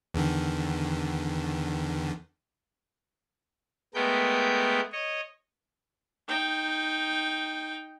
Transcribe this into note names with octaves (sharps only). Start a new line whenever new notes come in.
E2 D3 D#3
G#3 A3 B3 A#4 G5 G6
C#5 D#5
D#4 G5